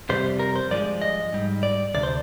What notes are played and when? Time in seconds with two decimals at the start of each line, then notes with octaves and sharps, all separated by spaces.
0.09 F2 C3 G3 C5
0.39 A#4
0.56 C5
0.71 G2 F3 G#3 D5
1.02 D#5
1.33 G#2 G3
1.63 D5
1.94 D2 C3 D5
2.03 C5